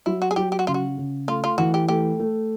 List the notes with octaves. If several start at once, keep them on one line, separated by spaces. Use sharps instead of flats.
F#3 E4
F#4
G#4
F#3 G4
G4
F#4
C#3 F4
F#4
C#3
A3 F4
F4
E3 F#4
G4
A3 G4
A3